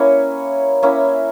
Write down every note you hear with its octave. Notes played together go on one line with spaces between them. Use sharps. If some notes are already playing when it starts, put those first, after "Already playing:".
Already playing: A#3 C#4 E4 C#5
A#3 C#4 E4 E5